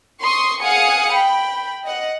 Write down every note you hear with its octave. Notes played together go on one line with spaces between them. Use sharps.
C6 C#6 D#6
G#4 F5 F#5 G#5 D#6 C#7
G5 B5
D#5 F#5